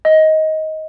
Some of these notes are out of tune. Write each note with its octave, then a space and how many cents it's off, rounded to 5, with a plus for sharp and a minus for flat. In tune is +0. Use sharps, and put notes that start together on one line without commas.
D#5 +15